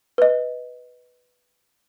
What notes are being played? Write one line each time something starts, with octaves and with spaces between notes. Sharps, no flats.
B4 D#5